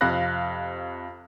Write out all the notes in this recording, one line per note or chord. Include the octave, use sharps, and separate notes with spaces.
F2 C3 F5 B5 F#6 A#6